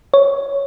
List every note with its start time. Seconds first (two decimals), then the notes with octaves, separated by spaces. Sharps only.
0.14 C#5